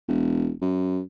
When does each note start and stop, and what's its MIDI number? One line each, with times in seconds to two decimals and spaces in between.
0.08 0.52 28
0.62 1.00 42